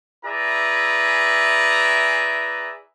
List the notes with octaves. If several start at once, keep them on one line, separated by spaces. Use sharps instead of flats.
E4 G#4 B4 D5 E5 A#5